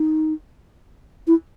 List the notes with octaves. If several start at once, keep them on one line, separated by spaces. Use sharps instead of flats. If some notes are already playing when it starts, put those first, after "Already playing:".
Already playing: D#4
E4